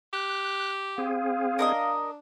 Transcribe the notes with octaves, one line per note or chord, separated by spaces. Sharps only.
G4 F#6
C4 G#4 F5
D4 A#4 B4 D#5